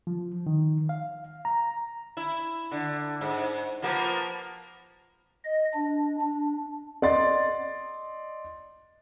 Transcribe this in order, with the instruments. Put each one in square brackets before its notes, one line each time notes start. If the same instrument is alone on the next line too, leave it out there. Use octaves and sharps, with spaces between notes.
[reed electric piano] F3
D#3
F5
A#5
[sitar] E4
D3
G#2
F3 A#3 B3
[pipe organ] D#5
D4
D4
[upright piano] D5 D#5 C6 A6